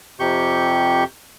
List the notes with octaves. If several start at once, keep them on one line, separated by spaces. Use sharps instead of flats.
F2 C3 G4 C#6 G6